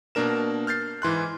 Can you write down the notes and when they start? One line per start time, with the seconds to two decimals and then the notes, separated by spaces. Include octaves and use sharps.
0.15 B2 A#3 D4 A#4 E7
0.67 F6 G6 A6 C7
1.02 G#2 E3 C6 F#6